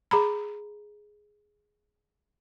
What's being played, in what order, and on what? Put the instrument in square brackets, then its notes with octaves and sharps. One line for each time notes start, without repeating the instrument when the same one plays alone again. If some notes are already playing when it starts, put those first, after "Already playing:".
[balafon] G#4 A#5 B5